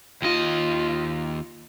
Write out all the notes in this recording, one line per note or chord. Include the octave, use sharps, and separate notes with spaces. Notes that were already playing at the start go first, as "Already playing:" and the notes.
D#2 F4 D#5